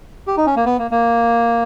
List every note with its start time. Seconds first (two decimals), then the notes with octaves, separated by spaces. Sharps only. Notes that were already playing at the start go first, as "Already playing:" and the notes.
0.27 G4
0.37 D#4
0.46 C#4
0.56 A#3
0.66 B3
0.79 A#3
0.91 A#3